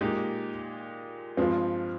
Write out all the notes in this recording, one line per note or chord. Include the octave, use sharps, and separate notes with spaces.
A#2 G#3 D#4 G4
G2 F3 G#3 C4 F4